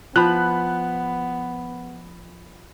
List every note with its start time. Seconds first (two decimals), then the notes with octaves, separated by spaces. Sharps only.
0.16 F3 B3 B5 F#6